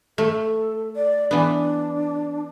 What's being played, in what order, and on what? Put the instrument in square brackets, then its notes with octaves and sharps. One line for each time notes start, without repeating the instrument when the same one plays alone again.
[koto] A3 [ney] A4
[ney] D5
[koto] E3 B3 [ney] D4